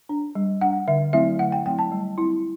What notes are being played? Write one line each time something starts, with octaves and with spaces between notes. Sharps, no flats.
D4
G3
D4 F#5
D3 E5
F#3 A3 C4 E4 E5
D3 F#5
G5
F#3 A3 C4 E4 G5
A5
G3
C4 E4